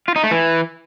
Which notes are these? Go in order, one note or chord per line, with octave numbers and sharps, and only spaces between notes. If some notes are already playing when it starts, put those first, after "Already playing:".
F4
D#4
A3
E3